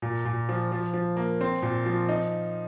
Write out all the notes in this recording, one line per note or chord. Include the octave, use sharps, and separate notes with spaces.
A#2
A#2
F3
F3
F3
A#3
C4
A#2
F3
D#4